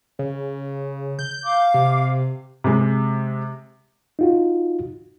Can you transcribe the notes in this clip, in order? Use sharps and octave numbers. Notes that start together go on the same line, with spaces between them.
C#3
G6
F5 D6
C3
C3 G#3
D#4 F4 F#4